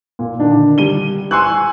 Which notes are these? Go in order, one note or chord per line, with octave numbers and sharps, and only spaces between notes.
A#2
D3 D#3 D4
G3 D#7 G7
G#5 C6 C#6 E6 F#6